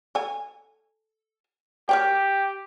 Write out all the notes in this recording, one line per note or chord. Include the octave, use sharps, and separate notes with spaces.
A4 G#5
G4 A#4 C#5 G5